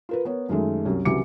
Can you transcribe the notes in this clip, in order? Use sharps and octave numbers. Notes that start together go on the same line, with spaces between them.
F4 A#4 B4
B3 A#4 C#5
F#2 D#3 G#3 A3
C2 F#2
C2 C#3 E3 F#3 D6 C#7